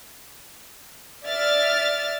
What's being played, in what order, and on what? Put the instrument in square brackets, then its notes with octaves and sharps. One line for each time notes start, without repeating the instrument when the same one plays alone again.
[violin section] D5 E5 F6 A6